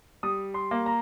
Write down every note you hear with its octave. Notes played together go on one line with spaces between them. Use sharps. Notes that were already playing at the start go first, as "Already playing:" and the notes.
G3 D#6
C6
A#3
A#5